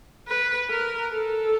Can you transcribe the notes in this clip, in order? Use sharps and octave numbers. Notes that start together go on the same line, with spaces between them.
B4
A#4
A4